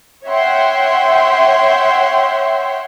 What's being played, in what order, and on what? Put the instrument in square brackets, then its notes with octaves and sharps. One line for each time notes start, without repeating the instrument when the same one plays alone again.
[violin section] C#5 E5 F#5 G5 C6